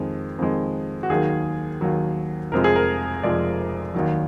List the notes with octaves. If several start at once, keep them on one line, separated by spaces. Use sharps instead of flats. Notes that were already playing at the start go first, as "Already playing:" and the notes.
Already playing: F2 D#3 G#3
F2 D#3 G#3
F#4
D#2 D#3 F#3 G#4
D#2 D#3 F#3
F1 F2 F3 G#3 A#4
G#4
A#4
F1 F2 F3 G#3 D5
D#2 D#3 F#3